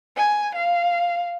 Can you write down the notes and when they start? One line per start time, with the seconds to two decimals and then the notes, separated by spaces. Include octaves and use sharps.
0.17 G#5
0.55 F5